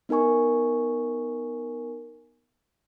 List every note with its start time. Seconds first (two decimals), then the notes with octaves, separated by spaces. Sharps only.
0.09 B3 D#4 A#4 G#5 C#6